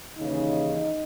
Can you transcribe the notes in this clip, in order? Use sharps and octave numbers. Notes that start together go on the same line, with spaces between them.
D#2 C#3 E3 D#4